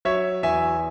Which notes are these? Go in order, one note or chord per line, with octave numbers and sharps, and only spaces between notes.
F#3 C#5 E5
E2 E5 G#5